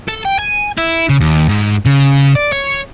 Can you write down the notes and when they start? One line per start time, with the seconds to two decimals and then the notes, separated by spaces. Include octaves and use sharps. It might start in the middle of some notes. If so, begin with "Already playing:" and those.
0.08 A4
0.25 G5
0.38 G#5
0.78 E4
1.09 C#3
1.20 D#2
1.49 G#2
1.86 C#3
2.35 D5
2.52 C#5